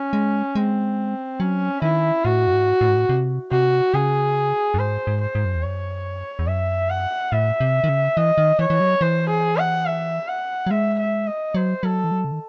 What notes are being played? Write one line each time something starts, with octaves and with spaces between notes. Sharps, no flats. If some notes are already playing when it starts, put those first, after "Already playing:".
Already playing: C#4
G#3
G#3 C4
F#3 C#4
D#3 E4
A2 F#4
F#2
G#2
A2
G#2
A2
C3
C3 F#4
C#3 G#4
F#2
G#2 C5
G#2
C5
G#2
F#2
E2
F#2 C#5
E2
F#2 E5
F#5
A2 E5
C3
D#3
C#3
E3 D#5
D#3
E3 C#5
E3
F#3
E3 C5
G#4
F#5
E5
F#5
F#3
G#3 E5
E5
D#5
F#3 C5
F#3 A4
E3
F#3
C#3
D#3